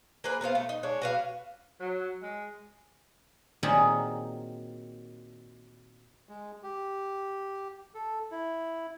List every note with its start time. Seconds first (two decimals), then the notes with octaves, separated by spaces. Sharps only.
0.24 A#3 G#4 B4 C5
0.41 B3 F4 C5 F5
0.55 A3
0.69 D#4
0.83 G#3 D4 C#5
1.02 F#4 B4 F5
1.80 F#3
2.22 G#3
3.63 A#2 D#3 F#3 C4 G4 G#4
6.29 G#3
6.63 G4
7.95 A4
8.31 E4